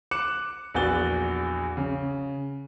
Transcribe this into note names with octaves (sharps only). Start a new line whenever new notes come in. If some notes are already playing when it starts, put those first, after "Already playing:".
D6 F#6 C#7 E7
A#1 E2 F#4 F#6 A6 G7
C#3